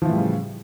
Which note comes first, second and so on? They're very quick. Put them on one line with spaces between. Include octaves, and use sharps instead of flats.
F3 E3 A2 G3 C#3